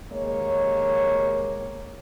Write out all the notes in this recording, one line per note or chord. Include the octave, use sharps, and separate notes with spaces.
D#2 G#3 A#3 C#5